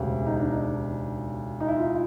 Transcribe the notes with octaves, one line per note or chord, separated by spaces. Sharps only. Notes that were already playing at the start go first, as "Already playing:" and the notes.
Already playing: E1 D2 C#3 G4
D#4
D4
D#4
D#4
E4
F4